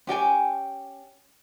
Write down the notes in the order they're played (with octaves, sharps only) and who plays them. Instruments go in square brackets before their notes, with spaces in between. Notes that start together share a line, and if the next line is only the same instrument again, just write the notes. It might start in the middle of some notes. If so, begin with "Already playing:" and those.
[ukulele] C#4 G4 G5 G#5